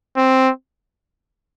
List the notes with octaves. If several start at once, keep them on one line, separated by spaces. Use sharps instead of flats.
C4